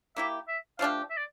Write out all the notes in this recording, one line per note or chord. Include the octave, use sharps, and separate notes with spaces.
A#3 E4 G4 E5
E5
F3 A3 D4 G4 F5
E5
D5